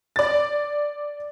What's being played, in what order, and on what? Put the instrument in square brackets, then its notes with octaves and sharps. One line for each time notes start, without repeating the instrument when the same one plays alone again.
[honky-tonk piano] D5 A6